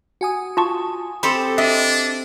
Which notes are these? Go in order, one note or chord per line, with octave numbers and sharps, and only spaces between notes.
F#4 G#5 D#6
F4 A5 C#6
C4 G4 A4 B5 C6
D4 D#5 E5